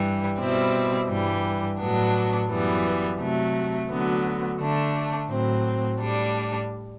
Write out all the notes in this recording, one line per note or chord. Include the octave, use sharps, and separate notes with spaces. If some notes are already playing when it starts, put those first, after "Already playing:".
Already playing: G2 E3 G3
B2 G3 C4 E4
G2 E3 G3
A2 F#3 B3 D4
F#2 E3 G3 B3
C3 F#3 A3
D2 D3 F#3 B3
D3 A3 D4
A2 F#3 C4
A2 G3 D4